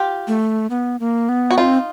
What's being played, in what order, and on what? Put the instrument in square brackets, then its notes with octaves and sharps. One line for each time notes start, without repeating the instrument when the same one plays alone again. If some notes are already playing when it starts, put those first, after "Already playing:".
Already playing: [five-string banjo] F4 G4
[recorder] A3
B3
A#3
B3
[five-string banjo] F#4
[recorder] C4 [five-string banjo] D#4 F4